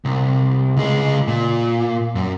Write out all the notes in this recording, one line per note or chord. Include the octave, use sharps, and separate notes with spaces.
C2
C#2 G#3
A#2
F#2